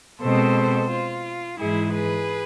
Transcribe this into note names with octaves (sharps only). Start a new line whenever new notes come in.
B2 G#3 C4 A4 C5
F4
G#2 E3 G#3 E4 G#4
G#4 B4